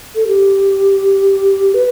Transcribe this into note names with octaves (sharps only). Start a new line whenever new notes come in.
A4
G4
B4